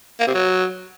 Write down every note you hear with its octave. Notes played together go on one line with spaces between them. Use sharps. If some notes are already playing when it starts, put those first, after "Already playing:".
A#3
C3
F#3